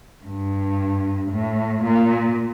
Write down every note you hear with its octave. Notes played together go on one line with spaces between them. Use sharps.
G2
A2
A#2